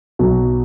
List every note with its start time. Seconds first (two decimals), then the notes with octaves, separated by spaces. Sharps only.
0.19 B1 B2 F#3